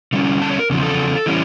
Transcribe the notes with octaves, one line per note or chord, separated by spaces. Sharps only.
D3 G3 C#4
A5
C#5
A#4
E2 C#3 F3
A4
E3 G3 C#4